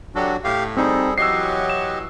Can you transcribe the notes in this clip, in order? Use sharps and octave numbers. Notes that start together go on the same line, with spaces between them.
F#3 D4 F#4 G4 A4
A2 G4 F5
G3 C4 D#4 G#4 A4
E3 F#3 G4 D#5 E6 C7
E7